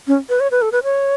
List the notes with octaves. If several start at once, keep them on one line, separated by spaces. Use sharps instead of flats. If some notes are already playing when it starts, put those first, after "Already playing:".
C#4
B4
C#5
B4
A4
B4
C#5